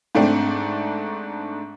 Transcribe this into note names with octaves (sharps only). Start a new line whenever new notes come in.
G#2 A3 C4 D4